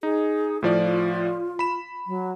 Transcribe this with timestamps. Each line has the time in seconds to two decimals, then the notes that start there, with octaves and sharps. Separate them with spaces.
0.03 D#4 G#4
0.62 A2 F3 F4 D5
1.59 B5 E7
2.07 F#3